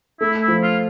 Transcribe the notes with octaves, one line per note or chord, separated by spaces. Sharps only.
A3 E4
E4
F3
F4